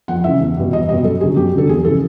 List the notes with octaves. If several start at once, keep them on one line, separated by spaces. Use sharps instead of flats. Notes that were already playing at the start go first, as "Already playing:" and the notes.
F2 F#5
C#3 E3 E5
E2
B2 G3
E2 D#5
B2 G3 D#5
F#2 A4
D3 F#3 G#4
F#2 G4
D3 F#3 A4
E2 G#4
C#3 E3 A4